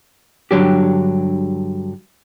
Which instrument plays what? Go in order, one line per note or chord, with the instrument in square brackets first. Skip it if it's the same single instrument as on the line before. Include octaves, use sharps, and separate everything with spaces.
[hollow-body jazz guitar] G2 D3 F#3 G4